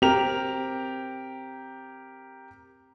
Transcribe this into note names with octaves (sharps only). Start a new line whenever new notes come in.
C4 G4 A#4 F7